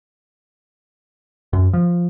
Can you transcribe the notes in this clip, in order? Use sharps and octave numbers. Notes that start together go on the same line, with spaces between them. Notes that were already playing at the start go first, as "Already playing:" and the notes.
F#2
F3